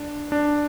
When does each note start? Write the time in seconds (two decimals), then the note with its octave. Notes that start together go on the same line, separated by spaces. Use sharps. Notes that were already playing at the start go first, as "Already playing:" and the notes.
Already playing: D4
0.32 D4